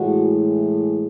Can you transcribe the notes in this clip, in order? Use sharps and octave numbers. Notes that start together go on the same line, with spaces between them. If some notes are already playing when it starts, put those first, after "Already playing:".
Already playing: A2 E3 G#3 F#4